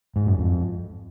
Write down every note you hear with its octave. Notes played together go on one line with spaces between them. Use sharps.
G#2
F#2
F2